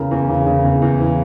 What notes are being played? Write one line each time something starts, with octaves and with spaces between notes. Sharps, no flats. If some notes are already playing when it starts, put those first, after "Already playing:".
Already playing: E2 C#3 A#4
E2
C#3
C#3
E2
E2
E3